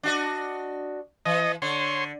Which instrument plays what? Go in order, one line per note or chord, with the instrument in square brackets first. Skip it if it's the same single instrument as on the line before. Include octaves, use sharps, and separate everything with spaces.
[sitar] D4 F#4 D#5
[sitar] E3 [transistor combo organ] D#5
[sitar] D3 [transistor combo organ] C#5 C6